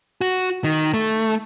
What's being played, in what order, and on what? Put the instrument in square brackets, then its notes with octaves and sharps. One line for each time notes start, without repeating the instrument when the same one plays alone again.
[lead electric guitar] F#4
D#3
A3